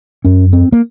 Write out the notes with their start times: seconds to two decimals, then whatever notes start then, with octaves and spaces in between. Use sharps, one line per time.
0.25 F#2 C#4
0.53 C4
0.72 A#3